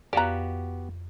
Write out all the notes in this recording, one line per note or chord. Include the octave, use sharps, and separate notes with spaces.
F2 B3 F#4 G4 D5 F5 A#5 F#6